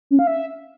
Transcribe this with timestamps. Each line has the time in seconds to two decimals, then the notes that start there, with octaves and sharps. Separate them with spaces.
0.11 C#4
0.19 F5
0.27 E5